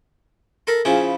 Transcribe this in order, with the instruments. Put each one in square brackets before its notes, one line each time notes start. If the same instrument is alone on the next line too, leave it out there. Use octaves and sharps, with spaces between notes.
[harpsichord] A4 A#4 B5
[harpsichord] C#3 F3 E4 [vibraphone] F4 G#4 G#5
[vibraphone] B5